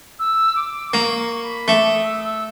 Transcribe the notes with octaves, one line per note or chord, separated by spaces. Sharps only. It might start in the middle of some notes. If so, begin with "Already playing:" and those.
E6
D6
A#3 C#6
C#6
B5
A3 D6
D#6
E6
E6